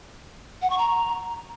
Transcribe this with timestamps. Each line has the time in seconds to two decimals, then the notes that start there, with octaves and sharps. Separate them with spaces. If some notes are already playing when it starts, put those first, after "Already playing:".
0.62 F#5
0.70 C#6
0.78 A#5